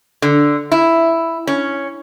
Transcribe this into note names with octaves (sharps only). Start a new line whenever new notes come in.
D3
E4
C#4